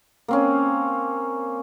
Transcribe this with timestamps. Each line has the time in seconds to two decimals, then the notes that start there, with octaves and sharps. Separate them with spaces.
0.28 A#3 C4 C#4